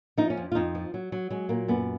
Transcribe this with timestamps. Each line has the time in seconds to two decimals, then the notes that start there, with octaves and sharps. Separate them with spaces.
0.17 F3 D#4
0.30 C#4
0.37 F2
0.52 F4
0.55 F2 D#4
0.75 F3
0.94 F#3
1.12 F#3
1.30 F#3 G#3
1.49 A#2 A#3
1.68 F#2 B3